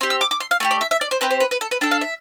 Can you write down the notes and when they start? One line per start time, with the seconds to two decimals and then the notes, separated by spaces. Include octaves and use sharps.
0.01 C4 G4 C6
0.10 E6
0.21 D6
0.31 D6
0.40 C6
0.51 F5
0.60 A3 E4 G4
0.71 D5
0.81 E5
0.91 E5
1.01 D5
1.11 C5
1.21 C4 G4 B4
1.31 C5
1.40 B4
1.51 B4
1.61 A4
1.71 B4
1.81 D4 A4 G5
1.91 F5
2.01 E5